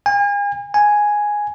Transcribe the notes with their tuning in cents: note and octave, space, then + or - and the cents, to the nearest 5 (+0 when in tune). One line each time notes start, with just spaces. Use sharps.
G#5 -40
G#5 +0